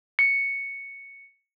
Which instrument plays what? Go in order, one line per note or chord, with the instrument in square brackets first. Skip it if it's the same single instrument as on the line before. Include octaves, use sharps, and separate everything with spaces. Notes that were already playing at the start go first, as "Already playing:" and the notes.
[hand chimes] C#7